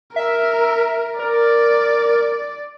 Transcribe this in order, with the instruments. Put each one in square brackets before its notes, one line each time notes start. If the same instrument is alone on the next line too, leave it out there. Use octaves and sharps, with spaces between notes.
[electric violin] A#4 [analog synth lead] E5
[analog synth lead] A#4 [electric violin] D5